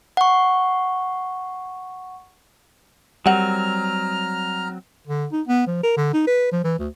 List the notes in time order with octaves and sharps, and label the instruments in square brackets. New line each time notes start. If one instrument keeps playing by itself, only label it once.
[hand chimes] F#5 C#6
[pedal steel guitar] F#3 C4 [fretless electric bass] G3 [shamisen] A#4 F#5 [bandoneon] A#5 F6
[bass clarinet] D3
D#4
B3
F3
A#4
D3
D#4
B4
F3
E3
D2